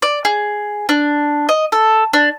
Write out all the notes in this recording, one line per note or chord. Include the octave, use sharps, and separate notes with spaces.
D5
G#4
D4
D#5
A4
D4